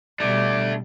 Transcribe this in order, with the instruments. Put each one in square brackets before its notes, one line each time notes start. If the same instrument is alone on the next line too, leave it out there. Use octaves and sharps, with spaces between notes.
[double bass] B2 G3 [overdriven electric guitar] A3 D4 [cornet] D5